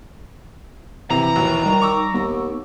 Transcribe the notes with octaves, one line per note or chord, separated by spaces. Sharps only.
C3 E3 A#5
D#2 B2
D#3 G3
C#6 D6 E6
D#2 B3